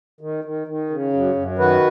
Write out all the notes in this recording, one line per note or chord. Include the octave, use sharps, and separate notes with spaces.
D#3
D#3
D#3
C#3
F#2
F#2
D#3 F#4 B4